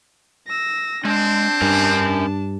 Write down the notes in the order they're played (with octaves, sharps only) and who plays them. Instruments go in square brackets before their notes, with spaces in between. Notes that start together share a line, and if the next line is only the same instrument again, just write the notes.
[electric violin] E6 A#6
[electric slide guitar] G#3 [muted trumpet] C4 [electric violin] D4 A5
[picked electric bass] G2 [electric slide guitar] C#4 A#4 G#5